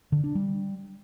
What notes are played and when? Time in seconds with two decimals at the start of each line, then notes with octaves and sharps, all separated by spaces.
0.12 D3
0.24 D4
0.35 G3